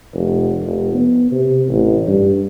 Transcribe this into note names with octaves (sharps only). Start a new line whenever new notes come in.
F1
F1
B3
C3
A1
G2